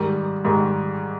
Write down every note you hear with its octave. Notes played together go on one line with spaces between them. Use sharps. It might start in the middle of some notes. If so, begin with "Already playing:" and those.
Already playing: G#2 D#3 G3
G#2 D#3 G3